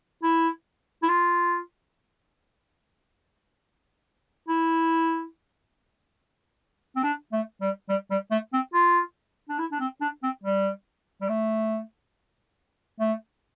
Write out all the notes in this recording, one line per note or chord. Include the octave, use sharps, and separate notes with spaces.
E4
E4
F4
E4
C4
D4
A3
G3
G3
G3
A3
C4
F4
D4
E4
D4
C4
D4
C4
G3
G3
A3
A3